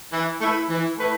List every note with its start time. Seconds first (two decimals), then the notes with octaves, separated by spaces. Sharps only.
0.13 E3
0.41 A3 E4 B4
0.70 E3
0.99 A3 E4 B4